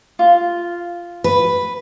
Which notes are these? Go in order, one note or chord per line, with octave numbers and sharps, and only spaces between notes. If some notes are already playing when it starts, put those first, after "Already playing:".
F4
B4